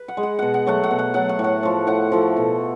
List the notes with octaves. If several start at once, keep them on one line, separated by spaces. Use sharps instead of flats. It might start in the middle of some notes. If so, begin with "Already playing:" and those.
Already playing: B4
F#5
G#3
F#5
B2 F#5
F#5
F#3 A3 F#5
F#5
B2
F#5
F#3 A3 F#5
F#5
A2
F#5
F3 A3
A2 F#5
F3 A3
B2